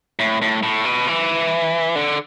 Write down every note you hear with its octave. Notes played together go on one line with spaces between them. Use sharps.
A2
A2
A2
B2
E3
D3